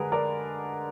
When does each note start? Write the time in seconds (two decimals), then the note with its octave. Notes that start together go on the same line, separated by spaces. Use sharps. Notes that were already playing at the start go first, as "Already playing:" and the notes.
Already playing: D3 G#3 G#4 A#4 B4
0.12 A#4 D5